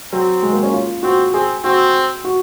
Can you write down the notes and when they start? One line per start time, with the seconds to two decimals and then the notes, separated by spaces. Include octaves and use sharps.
0.12 F#3 C4
0.43 G#3
0.53 A#3
0.63 C#4
0.73 F4
1.03 C4 F#4
1.34 C4 G#4
1.64 C4 F#4
2.24 F#4